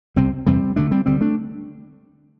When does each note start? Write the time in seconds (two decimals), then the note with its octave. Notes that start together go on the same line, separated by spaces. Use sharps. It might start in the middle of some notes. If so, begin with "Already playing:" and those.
0.16 C2 C3 G3 C4
0.47 E2 C3 G3 C4
0.76 D2 D3 A3 D4
0.91 G3 C4
1.06 D2 D3 G3 C4
1.21 A3 D4